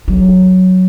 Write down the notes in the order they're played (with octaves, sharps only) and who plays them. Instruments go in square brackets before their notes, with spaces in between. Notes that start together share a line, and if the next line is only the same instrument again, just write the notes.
[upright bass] F#3